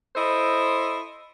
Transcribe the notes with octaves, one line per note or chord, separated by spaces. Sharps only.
E4 A4 C5 D#5